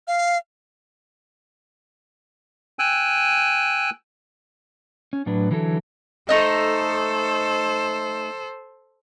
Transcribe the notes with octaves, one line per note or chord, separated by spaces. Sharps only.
F5
G5 G#5 E6 F#6
C#4
A2 F#3 D4 B4
D3 E3 F#3 E4 A4
A3 D#4 A4 C5 D#5